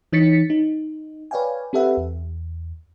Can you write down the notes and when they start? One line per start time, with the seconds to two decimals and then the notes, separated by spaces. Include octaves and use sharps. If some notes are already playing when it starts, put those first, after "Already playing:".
0.12 E3 D#4 C#5 A6 B6 C#7
0.50 D#4
1.31 B4 C#5 D5 F5 G5 G#5
1.73 C4 G4 A4 B4 E5 F#5
1.97 E2